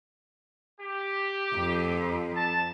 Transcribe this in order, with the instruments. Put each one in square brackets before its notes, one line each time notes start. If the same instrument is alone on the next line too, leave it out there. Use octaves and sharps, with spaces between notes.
[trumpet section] G4
[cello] F2
[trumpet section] A5